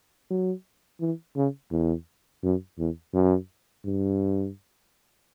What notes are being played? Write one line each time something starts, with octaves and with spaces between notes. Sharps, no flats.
F#3
E3
C#3
E2
F#2
E2
F#2
G2